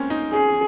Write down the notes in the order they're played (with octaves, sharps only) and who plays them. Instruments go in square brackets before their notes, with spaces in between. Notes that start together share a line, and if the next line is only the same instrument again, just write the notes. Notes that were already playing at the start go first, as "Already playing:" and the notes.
Already playing: [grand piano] G#3 A#3 C4 C#4
D#4
[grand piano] C#4 [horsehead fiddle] G#4